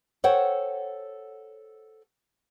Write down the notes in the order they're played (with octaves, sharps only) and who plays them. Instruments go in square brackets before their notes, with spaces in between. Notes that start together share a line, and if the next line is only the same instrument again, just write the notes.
[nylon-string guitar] A4 C5 C#5 F#5 G5